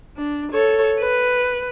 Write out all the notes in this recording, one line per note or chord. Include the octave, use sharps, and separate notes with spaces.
D4
A4 C#5
B4